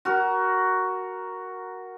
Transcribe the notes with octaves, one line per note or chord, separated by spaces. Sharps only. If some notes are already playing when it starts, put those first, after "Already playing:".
F#4 A#4